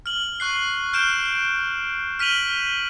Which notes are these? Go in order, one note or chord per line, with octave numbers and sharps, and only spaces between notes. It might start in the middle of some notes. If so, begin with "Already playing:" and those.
F6 F#7
C#6 F#6 C7
F6 G6 D7 E7
F6 B6 D#7 F7 F#7